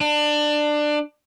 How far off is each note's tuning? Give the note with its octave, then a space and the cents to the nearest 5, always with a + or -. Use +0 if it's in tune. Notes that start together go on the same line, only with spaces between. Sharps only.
D4 +20